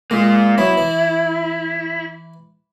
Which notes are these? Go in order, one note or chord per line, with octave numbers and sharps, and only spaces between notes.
G#3 A#3 F4
F#3 B3 E4
E3